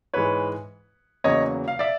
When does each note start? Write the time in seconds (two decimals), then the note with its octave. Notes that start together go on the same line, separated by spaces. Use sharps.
0.14 G#2 E3 G#3 B4 C#5
1.24 E2 C#3 F#3 A#3 C#5 D#5
1.68 F5
1.79 D5 E5